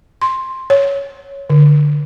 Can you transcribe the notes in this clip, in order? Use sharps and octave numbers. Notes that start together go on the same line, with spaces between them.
C6
C#5
D3